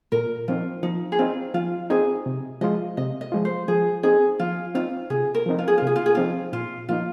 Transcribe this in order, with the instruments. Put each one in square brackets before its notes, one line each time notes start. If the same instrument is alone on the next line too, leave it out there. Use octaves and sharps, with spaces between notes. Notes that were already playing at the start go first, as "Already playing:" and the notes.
[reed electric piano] A#2 [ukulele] A#4
[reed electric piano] F3 C4 D#4 [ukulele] F4
[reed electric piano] F3 [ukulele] D#4
[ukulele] G#4
[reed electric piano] C4 D#4 [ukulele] F4
[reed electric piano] F3 [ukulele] F4
[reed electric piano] C4 D#4 [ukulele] G#4
[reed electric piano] C3
[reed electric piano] F3 G#3 F4 [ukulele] D#5
[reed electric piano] C3 [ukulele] D#5
[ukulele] D#5
[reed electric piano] F3 G#3 F4
[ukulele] C5
[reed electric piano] F3 [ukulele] G#4
[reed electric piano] C4 D#4 [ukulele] G#4
[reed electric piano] F3 [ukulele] F4
[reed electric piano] C4 D#4 [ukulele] F4
[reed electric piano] C3 [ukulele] G#4
[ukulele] A#4
[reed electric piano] F3 C4 D#4
[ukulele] F4
G#4
F4
[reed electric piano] C3 [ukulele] G#4
[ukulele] F4
G#4
[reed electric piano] F3 C4 D#4 [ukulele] F4
[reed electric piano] A#2 [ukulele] F4
[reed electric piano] F3 A#3 D#4 [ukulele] F4